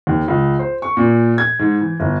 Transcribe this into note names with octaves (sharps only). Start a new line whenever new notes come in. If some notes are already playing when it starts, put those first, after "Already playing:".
D#2
C#2
C5
C#6
A#2
G#6
G#2
E3
G1